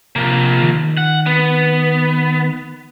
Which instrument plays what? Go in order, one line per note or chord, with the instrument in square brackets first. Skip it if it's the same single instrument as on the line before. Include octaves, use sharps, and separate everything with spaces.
[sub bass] C3 [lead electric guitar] F3 A#3
[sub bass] D#3
[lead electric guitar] F#5
B3